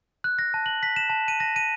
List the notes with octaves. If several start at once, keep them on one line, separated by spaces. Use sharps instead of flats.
F#6
A#6
A5
F#7
B6
E7
A5
D#7
A#6
D#7